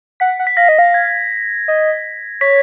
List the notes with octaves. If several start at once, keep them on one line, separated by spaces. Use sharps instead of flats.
F#5 B6
F#5
B6
F5 A#6
D#5
F5
G#6
D#5
C#5 B6